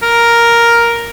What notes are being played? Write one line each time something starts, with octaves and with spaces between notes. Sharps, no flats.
A#4